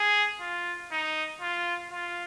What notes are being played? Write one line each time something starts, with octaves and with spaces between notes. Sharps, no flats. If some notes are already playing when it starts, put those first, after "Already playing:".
Already playing: G#4
F4
D#4
F4
F4